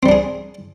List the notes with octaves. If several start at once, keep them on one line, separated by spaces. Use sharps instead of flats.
G3 C4 D4 G#4